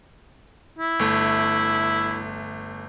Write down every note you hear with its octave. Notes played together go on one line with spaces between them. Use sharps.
E4
G1 A3